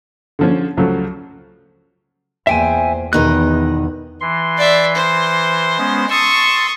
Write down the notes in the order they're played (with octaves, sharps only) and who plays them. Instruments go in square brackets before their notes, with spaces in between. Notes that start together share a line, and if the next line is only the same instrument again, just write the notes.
[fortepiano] D3 F3 C#4
C#2 F3 F#3 A3
[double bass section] E2 [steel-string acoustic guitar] A#2 C5 [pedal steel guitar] E5 G5 G#5
[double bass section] E2 [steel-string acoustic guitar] B2 D#3 D#5 [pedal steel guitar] F#6
[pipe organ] E3 C6
[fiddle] D5 E5
C5
[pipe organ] G#3 B3 C#4
[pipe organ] A5 C6 E6 [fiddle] C#6 D#6